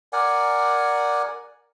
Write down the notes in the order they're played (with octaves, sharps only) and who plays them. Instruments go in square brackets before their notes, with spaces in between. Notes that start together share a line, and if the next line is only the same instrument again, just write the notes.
[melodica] A#4 D5 F#5 G#5